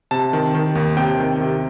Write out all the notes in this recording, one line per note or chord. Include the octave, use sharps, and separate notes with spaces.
C3 A5
D#3
D#3
D#2
C3 G5
D#3
C3